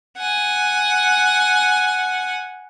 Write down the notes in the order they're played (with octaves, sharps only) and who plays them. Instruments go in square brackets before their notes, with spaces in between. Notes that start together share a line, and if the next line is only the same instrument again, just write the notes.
[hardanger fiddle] F#5 G#5